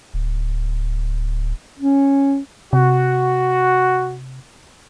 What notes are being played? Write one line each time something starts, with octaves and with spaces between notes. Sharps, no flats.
D1
C#4
C3 F#4